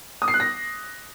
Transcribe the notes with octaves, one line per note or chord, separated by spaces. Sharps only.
D#6
C7
F#6
A#6